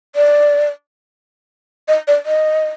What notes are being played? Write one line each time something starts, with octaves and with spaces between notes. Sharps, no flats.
D5
D#5
D5
D#5